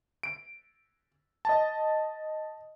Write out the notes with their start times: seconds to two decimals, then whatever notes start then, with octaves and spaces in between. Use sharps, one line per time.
0.23 D7
1.45 D#5 A5